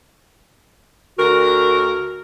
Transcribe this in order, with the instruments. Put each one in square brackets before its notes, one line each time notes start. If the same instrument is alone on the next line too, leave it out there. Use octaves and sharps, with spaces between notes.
[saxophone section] D2 D3 A#4 [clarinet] F#4